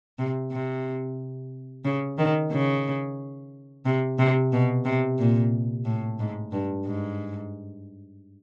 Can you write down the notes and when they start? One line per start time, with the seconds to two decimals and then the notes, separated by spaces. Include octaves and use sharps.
0.19 C3
0.51 C3
1.85 C#3
2.18 D#3
2.52 C#3
3.86 C3
4.19 C3
4.52 B2
4.85 C3
5.19 A#2
5.85 A2
6.19 G#2
6.52 G2
6.86 G#2